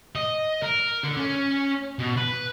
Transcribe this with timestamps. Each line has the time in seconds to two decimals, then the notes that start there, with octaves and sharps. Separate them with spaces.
0.16 D#5
0.62 A#4
1.03 D3
1.17 C#4
1.99 B2
2.17 B4